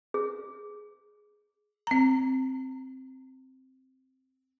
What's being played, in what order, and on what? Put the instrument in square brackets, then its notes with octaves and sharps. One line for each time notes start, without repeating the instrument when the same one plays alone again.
[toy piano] G#4
[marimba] C4 A#5